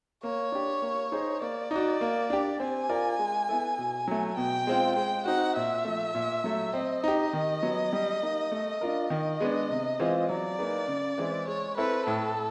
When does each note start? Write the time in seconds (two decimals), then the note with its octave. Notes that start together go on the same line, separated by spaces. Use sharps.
0.23 A#3 C#5
0.52 D4 G4
0.82 A#3
1.12 D#4 G#4 C5 D#5
1.41 A#3 D5
1.71 D#4 F#4
2.01 A#3
2.30 D4 G4
2.60 C4 G#5
2.89 F4 A#4 D5
3.19 G#3
3.49 B3 E4 A4
3.78 B2
4.07 F#3 A3
4.37 B2 G5
4.67 G#3 C4 F4
4.96 G#3 G5
5.25 C4 D#4 F#4 F#5
5.56 A#2 E5
5.85 F3 A3
6.15 A#2
6.44 F#3 A3
6.74 C4 D#5
7.04 D#4 G4
7.33 D#3
7.63 F#3 B3
7.93 G3
8.22 A#3 D#4
8.52 A3
8.81 D4 F4 A#4
9.10 D#3 D#5
9.40 G#3 B3 D4
9.70 C3
9.99 E3 G#3 C4 F4
10.29 F#3 D5
10.59 A#3 D#4 G#4 B4
10.88 C#3
11.18 E3 G#3 C4 E4
11.48 G#3 C#5
11.77 C4 E4 A4 B4
12.06 A2 A4